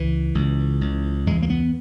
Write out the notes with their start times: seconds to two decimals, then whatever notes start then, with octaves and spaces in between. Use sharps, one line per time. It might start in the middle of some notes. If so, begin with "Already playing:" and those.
Already playing: C#2 E3
0.35 C#2
0.81 C#2
1.27 E2 G#3
1.42 A#3
1.50 B3